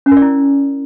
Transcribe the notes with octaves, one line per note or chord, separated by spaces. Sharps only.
C#4
A#4
D5
E4